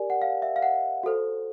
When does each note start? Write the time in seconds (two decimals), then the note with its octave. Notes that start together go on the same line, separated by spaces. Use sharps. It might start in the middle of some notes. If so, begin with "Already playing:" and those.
Already playing: G4 A#4 D5 G#5
0.10 F#5
0.22 F5
0.42 E5
0.56 F5
0.63 F#5
1.03 F#4 A4 C5